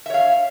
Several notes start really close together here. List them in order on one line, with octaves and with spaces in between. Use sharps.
E5 C#5 F5